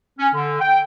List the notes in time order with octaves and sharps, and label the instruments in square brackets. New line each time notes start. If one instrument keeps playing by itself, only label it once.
[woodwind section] C#4
D3
G5